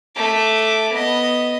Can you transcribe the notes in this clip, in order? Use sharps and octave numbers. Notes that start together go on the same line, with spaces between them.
A3 D6
B3 D#5